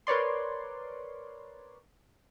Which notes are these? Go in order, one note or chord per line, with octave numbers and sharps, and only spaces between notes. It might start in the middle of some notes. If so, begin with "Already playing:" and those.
A#4 B4 C#5 D5 C6